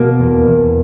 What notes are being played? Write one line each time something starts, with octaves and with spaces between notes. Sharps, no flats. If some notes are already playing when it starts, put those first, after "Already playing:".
Already playing: B2 A#3
E2
E2